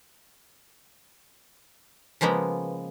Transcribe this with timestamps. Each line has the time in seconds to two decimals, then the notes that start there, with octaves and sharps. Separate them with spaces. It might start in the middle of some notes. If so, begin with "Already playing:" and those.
2.21 C#3 F3 G#3 A#3 B3